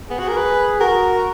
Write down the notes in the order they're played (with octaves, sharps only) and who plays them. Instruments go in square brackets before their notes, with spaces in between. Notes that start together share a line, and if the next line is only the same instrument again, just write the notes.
[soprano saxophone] B3 [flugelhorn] G#4
[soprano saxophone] F#4
A#4
B4
[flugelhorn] F#4 [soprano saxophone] A#4